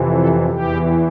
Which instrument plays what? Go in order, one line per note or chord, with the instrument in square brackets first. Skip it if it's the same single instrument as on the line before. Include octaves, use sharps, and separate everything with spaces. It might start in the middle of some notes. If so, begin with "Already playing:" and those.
Already playing: [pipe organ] F2 C3 E3
A4
E2 E3 G4